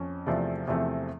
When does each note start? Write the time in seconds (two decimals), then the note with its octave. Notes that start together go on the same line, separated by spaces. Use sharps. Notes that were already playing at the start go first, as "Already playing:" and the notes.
Already playing: F2 C#4
0.26 E2 C3 F3 A3 C4 D5
0.67 E2 C3 F3 A3 C4